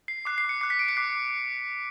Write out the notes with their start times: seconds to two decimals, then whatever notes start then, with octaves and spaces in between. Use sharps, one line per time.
0.08 C7
0.25 D6 F#6 C7
0.38 C7
0.49 C#7
0.61 D6 F#6 C7
0.70 B6
0.79 D7
0.89 C#7
0.97 D6 F#6 C7